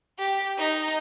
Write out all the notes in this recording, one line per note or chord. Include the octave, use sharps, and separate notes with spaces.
G4
D#4